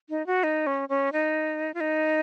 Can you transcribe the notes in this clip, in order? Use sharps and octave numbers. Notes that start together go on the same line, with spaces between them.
D#4
F#4
D#4
C#4
C#4
D#4
F4
D#4